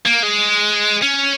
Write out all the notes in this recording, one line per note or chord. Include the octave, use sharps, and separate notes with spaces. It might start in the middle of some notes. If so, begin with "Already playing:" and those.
A#3
G#3
C#4